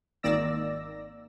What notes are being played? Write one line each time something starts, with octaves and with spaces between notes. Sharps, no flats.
G#1 D#3 A#3 D5 E6 A#6